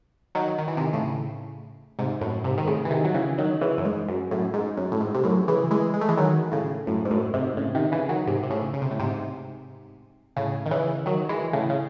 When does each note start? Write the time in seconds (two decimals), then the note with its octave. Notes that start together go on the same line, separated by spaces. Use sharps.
0.35 D#3 F#3
0.58 D#3
0.68 E3
0.77 C3 D#3
0.93 A2 C#3
1.99 G#2 C3
2.21 F#2 A2
2.44 G#2 C3
2.58 D#3
2.67 A2 C#3
2.85 E3
2.91 C3 D#3
3.05 F#3
3.14 C#3 E3
3.38 D#3 F#3
3.61 C#3 E3
3.78 F#2
3.85 G#2
4.08 F#2
4.31 F#2 A2
4.54 G#2
4.77 F#2
4.92 A2
5.01 G#2
5.14 C3
5.24 F#2 A2
5.48 C#3 E3
5.71 E3 G#3
5.94 G#3
6.01 A3
6.08 E3 G#3
6.17 D#3 F#3
6.52 A2 C#3
6.87 F#2 A2
7.05 G#2
7.10 F#2 A2
7.34 G#2 C3
7.57 A2 C#3
7.75 C3 D#3
7.92 C#3 E3
8.09 D#3 F#3
8.27 G#2 C3
8.43 C3
8.50 A2 C#3
8.73 C#3
8.82 C3
8.91 A2
8.99 G#2 C3
10.36 A2 C#3
10.66 D#3
10.71 C#3 E3
11.06 D#3 F#3
11.29 E3 G#3
11.53 A2 C#3
11.70 C#3